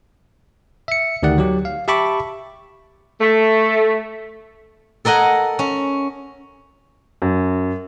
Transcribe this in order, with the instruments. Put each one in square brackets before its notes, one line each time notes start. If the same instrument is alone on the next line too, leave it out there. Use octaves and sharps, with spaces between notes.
[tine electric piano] E5 C#7
D2 D#3 G4 D5 F#5
F#3 G4
F5
G4 E5 A5 B5 C#6 D6
[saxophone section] A3
[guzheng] A4 A#4 D#5 F#5 G#5
C#4
[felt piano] F#2